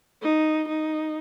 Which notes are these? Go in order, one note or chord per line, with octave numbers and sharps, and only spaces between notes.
D#4
D#4